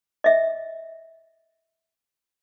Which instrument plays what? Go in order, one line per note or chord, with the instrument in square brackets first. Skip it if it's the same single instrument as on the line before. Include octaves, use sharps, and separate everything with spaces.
[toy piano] D#5 E5